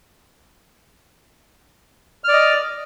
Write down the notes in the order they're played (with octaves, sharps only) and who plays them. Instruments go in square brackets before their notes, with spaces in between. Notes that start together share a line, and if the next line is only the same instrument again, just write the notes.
[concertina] F6
D5
D#5